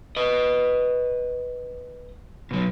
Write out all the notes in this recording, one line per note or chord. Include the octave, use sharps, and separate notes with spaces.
B4 D#5
B2 F#3